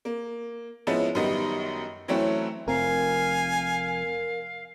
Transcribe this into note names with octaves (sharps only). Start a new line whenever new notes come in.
A#3
F3 G#3 B3 C#4 E4
F#2 D#3 G3 B3 D#5
E3 F#3 A3 C4 C#4 E4
F1 F2 C4 A#4 F5 G#5